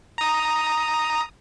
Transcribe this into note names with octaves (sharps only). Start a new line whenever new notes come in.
A#5 D#6